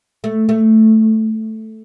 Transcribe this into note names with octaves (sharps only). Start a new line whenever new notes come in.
A3
A3